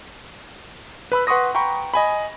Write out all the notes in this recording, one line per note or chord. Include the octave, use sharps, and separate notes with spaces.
B4 B5 E6
B4 F#5 C6 C#6 D#6 A#6
G5 A#5 B5 C#6
D#5 G#5 B5